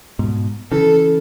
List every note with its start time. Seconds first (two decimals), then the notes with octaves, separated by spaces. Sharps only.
0.19 G#2 B2
0.71 C#3 E3 A4